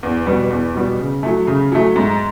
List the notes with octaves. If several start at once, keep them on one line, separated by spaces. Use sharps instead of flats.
E2
B2 G3 B3
E2
B2 G3 B3
C#3
F#3 A3
C#3
F#3 A3
G#2